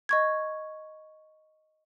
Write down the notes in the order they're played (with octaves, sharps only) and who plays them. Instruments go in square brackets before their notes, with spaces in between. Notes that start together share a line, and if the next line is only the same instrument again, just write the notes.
[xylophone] D#5 C#6 G#6